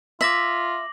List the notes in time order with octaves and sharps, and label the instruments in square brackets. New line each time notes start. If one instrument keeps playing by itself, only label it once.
[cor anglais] F4 [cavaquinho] E5 [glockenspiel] D6 A#6 F#7